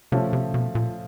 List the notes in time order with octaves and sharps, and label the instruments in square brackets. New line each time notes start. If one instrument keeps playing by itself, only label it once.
[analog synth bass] C3 [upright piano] F3 A3 C#4
[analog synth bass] C3
B2
A#2